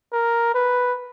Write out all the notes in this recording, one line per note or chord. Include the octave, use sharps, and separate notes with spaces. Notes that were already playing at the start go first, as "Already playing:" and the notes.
A#4
B4